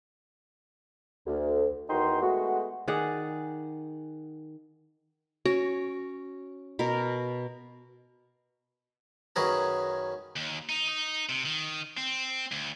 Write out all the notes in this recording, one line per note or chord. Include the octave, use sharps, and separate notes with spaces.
D2
E2 D#3 D#4 F#4 G5 C6
G#3 A3 B3 F#4
D#3 G#4 D5 F#5
C#4 F#4
B2 A#4
F#2 D#3 C#4 G#4 B4 A#5
D#2
D#4
D#4
C3
D#3
C4
D2